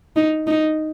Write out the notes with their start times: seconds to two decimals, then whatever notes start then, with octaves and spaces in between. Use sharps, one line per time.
0.16 D#4
0.47 D#4